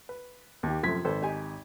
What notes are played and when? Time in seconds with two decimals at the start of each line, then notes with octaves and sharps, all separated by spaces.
0.09 B4
0.63 D#2 G4
0.83 F#2 C3 F3 A3 G#6 B6
1.05 G#1 A4 B4 C5
1.22 D#4 G4 G#5